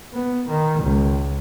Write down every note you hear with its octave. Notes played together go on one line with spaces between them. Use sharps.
B3
D#3
C#2